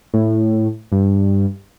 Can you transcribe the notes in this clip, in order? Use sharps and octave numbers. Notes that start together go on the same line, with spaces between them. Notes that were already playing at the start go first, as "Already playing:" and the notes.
A2
G2